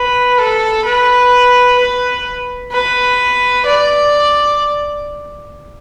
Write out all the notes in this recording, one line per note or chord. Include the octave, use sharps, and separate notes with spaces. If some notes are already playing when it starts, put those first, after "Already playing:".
Already playing: B4
A4
B4
B4
B4
D5